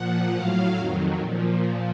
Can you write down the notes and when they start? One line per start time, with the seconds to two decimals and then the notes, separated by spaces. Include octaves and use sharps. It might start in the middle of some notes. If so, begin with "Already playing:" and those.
Already playing: A#2 F3 F#5
0.34 A2 F#3 F5
0.77 F2 D#3 F#3
1.19 A#2 F3